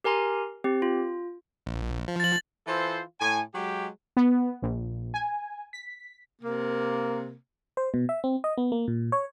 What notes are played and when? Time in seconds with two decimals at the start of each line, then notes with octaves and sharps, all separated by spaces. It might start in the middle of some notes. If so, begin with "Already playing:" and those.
0.04 G4 A#4 G#5 A#5 C6
0.64 C4 G4
0.82 F4
1.66 A#1
2.08 F3
2.20 A6 F#7
2.67 E3 F4 A4 C5
3.21 A2 G#5
3.54 F#3 G#3 G4
4.17 B3
4.62 A#1
5.14 G#5
5.73 B6
6.42 C3 A#3
7.77 C5
7.94 B2
8.09 E5
8.24 C4
8.44 D#5
8.58 B3
8.72 A#3
8.88 A#2
9.12 C#5